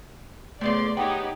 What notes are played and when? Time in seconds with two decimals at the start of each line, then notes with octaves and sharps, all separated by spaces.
0.61 A2 C#3 F3 A3 B3 D5 C6
0.97 B3 D#4 G4 C#5 G5